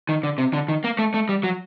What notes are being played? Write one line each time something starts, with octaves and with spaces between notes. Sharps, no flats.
D#3
D3
C3
D3
D#3
A#3
A3
A3
G3
F#3